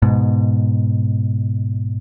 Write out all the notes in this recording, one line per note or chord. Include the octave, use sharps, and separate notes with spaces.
G#2 B2